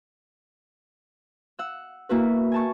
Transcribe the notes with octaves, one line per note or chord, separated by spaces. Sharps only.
F#5 E6
A#3 E4 F#4 B4
G#5 A5 C#6